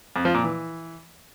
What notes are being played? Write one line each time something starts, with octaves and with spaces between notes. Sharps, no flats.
F2
F3
A#2
E3